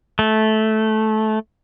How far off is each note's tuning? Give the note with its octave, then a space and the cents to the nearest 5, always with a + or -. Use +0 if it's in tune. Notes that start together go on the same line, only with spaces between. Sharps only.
A3 -15